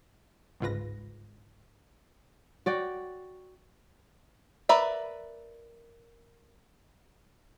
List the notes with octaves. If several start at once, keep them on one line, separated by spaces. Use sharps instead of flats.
G1 C#2 G#2 F4 B4 A#6
F#4 D5 G5
A#4 B4 D5 E5